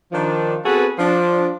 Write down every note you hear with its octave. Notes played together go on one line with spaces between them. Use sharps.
D#3 F3 D4
B3 C4 F#4 G#4 A4 B4
F3 D4